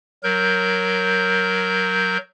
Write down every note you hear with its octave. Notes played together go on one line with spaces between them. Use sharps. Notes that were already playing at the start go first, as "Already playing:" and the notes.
F#3 A#4 G6